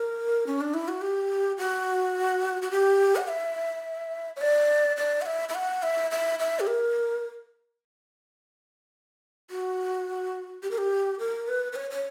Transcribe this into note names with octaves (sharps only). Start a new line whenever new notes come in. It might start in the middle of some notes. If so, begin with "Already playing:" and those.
Already playing: A#4
C#4
D4
E4
F#4
G4
F#4
F#4
G4
F#5
E5
C#5
D5
D5
F#5
E5
E5
F#5
E5
E5
E5
G4
A#4
F#4
G4
A#4
G4
A#4
B4
B4
C#5
C#5